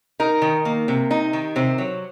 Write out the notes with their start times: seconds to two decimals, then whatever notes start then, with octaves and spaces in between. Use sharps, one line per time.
0.20 D#4 A#4
0.42 D#3
0.65 A#3
0.88 C3
1.11 D#4
1.33 D#3
1.56 C3 C5
1.78 F#3